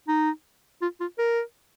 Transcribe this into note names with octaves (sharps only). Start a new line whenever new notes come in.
D#4
F4
F4
A#4